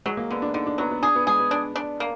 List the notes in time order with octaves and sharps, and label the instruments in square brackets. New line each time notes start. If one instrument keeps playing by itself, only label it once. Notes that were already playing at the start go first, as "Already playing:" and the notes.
[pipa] F#3 [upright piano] G#3
[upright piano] A#3
[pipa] D3 [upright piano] B3
[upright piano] D4
[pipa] D3 [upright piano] D#4
[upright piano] D4
[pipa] F#3 [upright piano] B3
[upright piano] B3
[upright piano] D4 [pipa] G#4
[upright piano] B3
[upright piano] G#3 [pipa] G#4
[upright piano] B3
[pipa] D4
D4
A#3